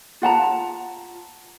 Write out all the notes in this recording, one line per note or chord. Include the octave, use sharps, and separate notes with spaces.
F4 F#5 A5 A#5